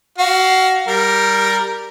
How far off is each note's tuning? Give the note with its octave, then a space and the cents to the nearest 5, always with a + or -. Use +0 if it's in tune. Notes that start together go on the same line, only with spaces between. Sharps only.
F#4 +25 F5 +0
G3 +0 A#4 +0